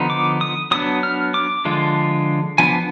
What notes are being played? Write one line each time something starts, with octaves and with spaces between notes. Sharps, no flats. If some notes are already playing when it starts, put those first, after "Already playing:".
Already playing: D3 F3 B3 D#4
D6
D#6
F#3 B3 D4 D#6
F6
D6
D3 F3 G#3 D4 F4
F3 B3 D4 G#5